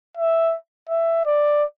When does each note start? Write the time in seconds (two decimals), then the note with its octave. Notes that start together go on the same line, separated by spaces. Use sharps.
0.17 E5
0.89 E5
1.26 D5